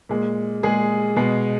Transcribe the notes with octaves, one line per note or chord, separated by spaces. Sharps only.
A#2 G#3
A#2 G#3 G#4
B2 G#3